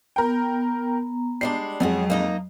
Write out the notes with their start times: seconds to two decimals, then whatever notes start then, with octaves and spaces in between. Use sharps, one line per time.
0.16 B3 A#4 G5 A#5
1.41 G3 G#3 D4 C7
1.80 F2 F#3 G#3 C#4 F#4 G#4
2.10 A#3 D#4 D#5